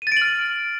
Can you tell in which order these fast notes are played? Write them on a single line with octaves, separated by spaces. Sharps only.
D#7 A6 D7 F#7 F6